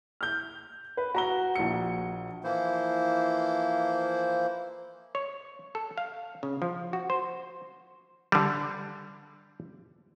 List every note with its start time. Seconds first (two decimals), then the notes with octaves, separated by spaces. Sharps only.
0.21 F6 G6
0.97 B4
1.15 F#4 A#5 G7
1.56 A#1 F#4 C#7
2.44 E3 F3 A#3 E4 C5
5.15 C#5
5.75 A4
5.98 F5
6.43 C#3
6.62 F3
6.93 F#4
7.10 C5
8.32 D3 G3